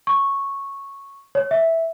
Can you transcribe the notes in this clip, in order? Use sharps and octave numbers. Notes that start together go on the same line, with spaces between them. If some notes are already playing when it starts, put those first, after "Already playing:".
C#6
C#5
E5